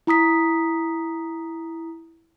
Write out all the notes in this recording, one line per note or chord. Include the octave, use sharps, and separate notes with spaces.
E4 A#5 D#6 B6